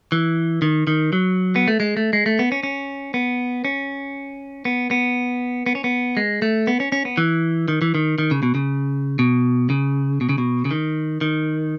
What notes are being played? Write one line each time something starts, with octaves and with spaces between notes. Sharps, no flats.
E3
D#3
D#3
F#3
B3
A3
G#3
A3
G#3
A3
B3
C#4
C#4
B3
C#4
B3
B3
B3
C#4
B3
G#3
A3
B3
C#4
C#4
B3
E3
D#3
E3
D#3
D#3
C#3
B2
C#3
B2
C#3
B2
C#3
B2
C#3
D#3
D#3